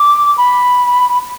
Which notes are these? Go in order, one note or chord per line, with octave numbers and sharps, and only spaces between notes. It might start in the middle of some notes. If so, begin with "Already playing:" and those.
Already playing: D6
B5